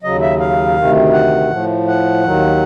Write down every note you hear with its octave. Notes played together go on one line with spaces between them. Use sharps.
D#2 C#3 F#3 D#5
E5
F5
D2 C3 D#3
F#5
A2 F3
F#5
D#2 D#3 F#3